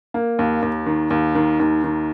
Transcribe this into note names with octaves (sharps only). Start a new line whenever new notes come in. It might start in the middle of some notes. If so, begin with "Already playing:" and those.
A#3
D#2
D#2
D#3
D#2
D#3
D#2
D#3